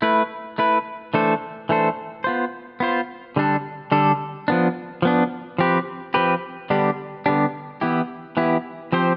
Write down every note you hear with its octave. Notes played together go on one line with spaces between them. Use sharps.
A3 E4 B4
A3 E4 B4
E3 A3 D4 A4 C5
E3 A3 D4 A4 C5
B3 F4 C5
B3 F4 C5
D3 G3 D4 A4
D3 G3 D4 A4
F3 B3 D4
F3 B3 D4
F3 C4 G4 B4
F3 C4 G4 B4
D3 G3 B3 D4 G4
D3 G3 B3 D4 G4
E3 B3 E4 G4
E3 B3 E4 G4
F3 C4 G4 C5